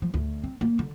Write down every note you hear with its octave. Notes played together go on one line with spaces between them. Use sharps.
F3
D2
C4
A#3
D3